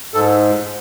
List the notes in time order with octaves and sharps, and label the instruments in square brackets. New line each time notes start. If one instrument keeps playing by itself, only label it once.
[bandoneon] G#2 A4